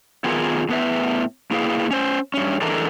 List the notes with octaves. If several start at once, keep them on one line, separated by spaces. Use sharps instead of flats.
D#3 B3 F4 G#4 A#4
A2 B3 B4 E5
A#3 E4 G#4 B4 F5
C#4 C5
G2 C#4
D3 E3 G#3 D4 A4 A#4